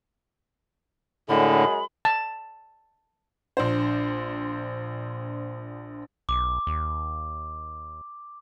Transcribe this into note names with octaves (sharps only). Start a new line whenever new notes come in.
F#2 A2 D3 G#3 B5
A5
A#1 D4 C5
B1 D6
D#2